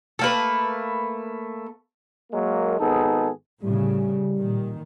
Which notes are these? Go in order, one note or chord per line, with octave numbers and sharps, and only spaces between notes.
A3 A#3 B4
F#3 G#3 A#3
G#1 B3 D#4 G#4 A4
A2 C#3 G3
A#2 D#3